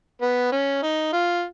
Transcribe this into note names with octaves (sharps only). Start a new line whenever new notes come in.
B3
C#4
D#4
F4